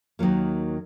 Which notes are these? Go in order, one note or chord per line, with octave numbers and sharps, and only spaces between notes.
D#2 D#3 F#3 A#3